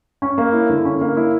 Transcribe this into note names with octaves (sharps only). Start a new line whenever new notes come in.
C#4
A#3
E4
D3
C#4
A#3
E4